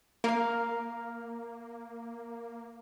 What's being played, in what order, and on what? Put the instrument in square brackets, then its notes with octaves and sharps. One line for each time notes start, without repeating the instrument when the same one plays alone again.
[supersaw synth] A#3 [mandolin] A#4 F5